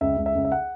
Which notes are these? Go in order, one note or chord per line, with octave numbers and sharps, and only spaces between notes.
C#2 E5
C#2
E5
C#2
E5
F#5